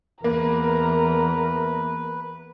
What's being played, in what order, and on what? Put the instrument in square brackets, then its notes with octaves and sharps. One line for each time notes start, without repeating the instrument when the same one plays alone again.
[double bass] E2 [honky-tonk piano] A#3 [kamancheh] A#4 [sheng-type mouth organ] B4